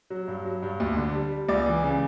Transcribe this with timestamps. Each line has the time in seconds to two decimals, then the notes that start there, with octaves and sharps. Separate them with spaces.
0.10 F#3
0.28 G2
0.45 F#3
0.62 G2
0.80 D2
0.97 D3
1.14 G3
1.32 G3
1.49 C#2 D5
1.66 E3
1.84 C#3